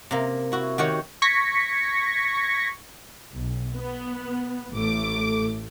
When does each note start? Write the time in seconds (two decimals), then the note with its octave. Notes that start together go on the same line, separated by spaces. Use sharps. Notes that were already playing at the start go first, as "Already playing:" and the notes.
0.11 C3 A#3
0.52 E4 F#4
0.78 D#3 F#4 G4 C#5
1.22 C#6 G#6 A#6 B6 C#7
3.34 B1
3.74 B3
4.71 A1 A3 D6